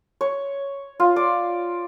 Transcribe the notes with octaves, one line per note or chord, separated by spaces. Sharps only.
C#5
F4
D5